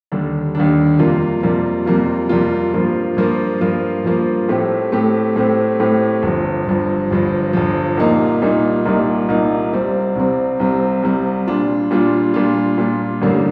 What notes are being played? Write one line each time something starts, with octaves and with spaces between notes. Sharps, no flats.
D#2 D3 G3 D4
D#2 D3 G3 D4
F2 C3 G3 A#3 F4
F2 C3 G3 A#3 F4
F2 C3 G3 A#3 F4
F2 C3 G3 A#3 F4
G2 F3 A#3 F4
G2 F3 A#3 F4
G2 F3 A#3 F4
G2 F3 A#3 F4
A2 A3 C4 G4
A2 A3 C4 G4
A2 A3 C4 G4
A2 A3 C4 G4
G1 G2 F3
G1 G2 F3
G1 G2 F3
G1 G2 F3
C2 A#2 G3 A#3 D#4
C2 A#2 G3 A#3 D#4
C2 A#2 G3 A#3 D#4
C2 A#2 G3 A#3 D#4
C2 C3 G3 C4
C2 C3 G3 C4
C2 C3 G3 C4
C2 C3 G3 C4
A#2 G3 D4 F4
A#2 G3 D4 F4
A#2 G3 D4 F4
A#2 G3 D4 F4
A1 G2 D3 G3 A#3